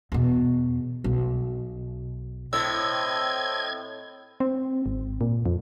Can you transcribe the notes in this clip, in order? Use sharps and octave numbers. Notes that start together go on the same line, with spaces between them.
E2 B2
B1
A2 C4 D#5 E6 G#6
C4
G#1
A#2
F2